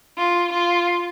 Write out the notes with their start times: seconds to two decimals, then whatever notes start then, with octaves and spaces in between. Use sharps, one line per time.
0.18 F4
0.52 F4